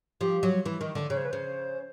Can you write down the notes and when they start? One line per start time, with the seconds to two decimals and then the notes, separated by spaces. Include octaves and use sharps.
0.21 F3 G4
0.43 F#3
0.66 E3
0.81 D#3
0.95 D3
1.10 C#3 C#5
1.17 C5
1.25 B4
1.31 C#3 C5